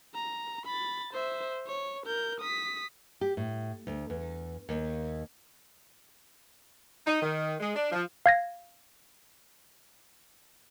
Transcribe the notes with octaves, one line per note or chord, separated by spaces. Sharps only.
A#5
B5 A6
C5 E5
C#5
A#4 G6
D#6 B6
G4
A2
D2
E2
D#2
D#4
D#3
G#3
D4
F3
F5 G#6 A#6